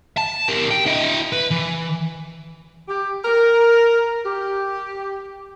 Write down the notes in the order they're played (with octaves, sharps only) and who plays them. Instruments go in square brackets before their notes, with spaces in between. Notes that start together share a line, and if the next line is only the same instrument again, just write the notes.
[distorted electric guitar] A5
G3 A#4
G5
E4 D#5
B4
E3
[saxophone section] G4
A#4
G4